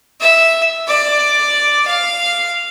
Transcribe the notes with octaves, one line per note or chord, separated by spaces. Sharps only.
E5
D5
F5